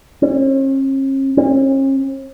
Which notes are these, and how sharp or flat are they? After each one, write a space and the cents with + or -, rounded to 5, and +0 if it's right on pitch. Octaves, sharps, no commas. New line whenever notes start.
C#4 -45
C#4 -45